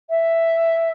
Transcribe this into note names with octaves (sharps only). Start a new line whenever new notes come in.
E5